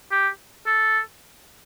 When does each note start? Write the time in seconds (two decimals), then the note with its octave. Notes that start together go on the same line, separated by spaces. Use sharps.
0.12 G4
0.66 A4